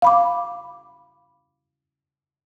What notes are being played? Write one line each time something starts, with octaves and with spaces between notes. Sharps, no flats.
F5 B5 D6